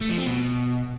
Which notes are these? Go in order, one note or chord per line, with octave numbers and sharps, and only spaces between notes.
A3
F3
C4
B2